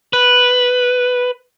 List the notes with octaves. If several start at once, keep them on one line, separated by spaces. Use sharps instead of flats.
B4